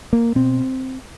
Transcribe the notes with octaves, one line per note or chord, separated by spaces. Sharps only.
A#3
B2 C4